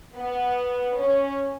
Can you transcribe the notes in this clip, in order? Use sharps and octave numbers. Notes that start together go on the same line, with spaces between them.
B3
C#4